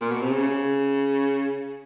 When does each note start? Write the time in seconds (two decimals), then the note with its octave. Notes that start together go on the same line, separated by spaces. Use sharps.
0.01 A#2
0.11 B2
0.22 C3
0.32 C#3